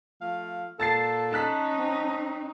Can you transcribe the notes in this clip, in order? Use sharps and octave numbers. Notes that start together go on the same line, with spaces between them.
F3 A3 F5
A#2 A4 A5 A6 C7
C#4 D#4 A5 F#6 B6
C4